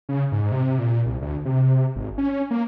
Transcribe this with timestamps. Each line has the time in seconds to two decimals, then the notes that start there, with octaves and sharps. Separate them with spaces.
0.09 C#3
0.32 G#2
0.52 C3
0.79 A#2
1.06 C2
1.21 D2
1.45 C3
1.96 G#1
2.18 C#4
2.51 A#3